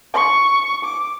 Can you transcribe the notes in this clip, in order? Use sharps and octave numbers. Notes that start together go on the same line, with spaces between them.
C#6
D6